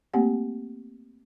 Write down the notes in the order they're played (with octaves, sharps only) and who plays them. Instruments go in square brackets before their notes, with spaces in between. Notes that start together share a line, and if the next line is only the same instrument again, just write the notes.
[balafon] A3 A#3 C4 G4 F#5